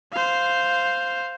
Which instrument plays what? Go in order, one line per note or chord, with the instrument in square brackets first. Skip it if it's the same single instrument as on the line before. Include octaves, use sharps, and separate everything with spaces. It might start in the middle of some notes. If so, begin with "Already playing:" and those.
[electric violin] C5 F5